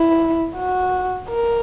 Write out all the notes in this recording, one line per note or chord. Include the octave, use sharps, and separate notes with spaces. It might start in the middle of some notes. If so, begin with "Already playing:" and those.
Already playing: E4
F#4
A#4